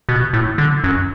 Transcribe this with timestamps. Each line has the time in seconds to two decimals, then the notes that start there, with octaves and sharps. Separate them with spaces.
0.09 B2
0.33 A2
0.58 D3
0.84 F#2